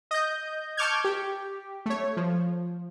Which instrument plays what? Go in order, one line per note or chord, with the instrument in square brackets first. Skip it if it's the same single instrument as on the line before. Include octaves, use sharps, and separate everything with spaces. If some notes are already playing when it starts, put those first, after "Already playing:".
[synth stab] D#5 G6
A5 C#6 D6 F6 G6 G#6
G4
A3 C#5
F3